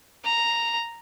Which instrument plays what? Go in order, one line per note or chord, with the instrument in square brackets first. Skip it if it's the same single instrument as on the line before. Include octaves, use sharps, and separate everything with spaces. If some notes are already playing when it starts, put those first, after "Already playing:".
[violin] A#5